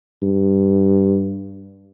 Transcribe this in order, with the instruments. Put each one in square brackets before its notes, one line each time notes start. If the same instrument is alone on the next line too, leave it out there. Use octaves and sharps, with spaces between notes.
[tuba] G2